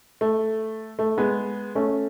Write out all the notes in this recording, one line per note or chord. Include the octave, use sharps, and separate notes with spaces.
A3
A3
G#3 B3
A3 C#4